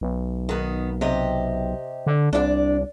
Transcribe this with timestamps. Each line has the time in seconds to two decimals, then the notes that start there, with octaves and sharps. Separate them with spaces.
0.01 B1
0.49 D#3 B3
1.01 C3 G4 D#5
2.07 D3
2.33 C2 D4 E4 D5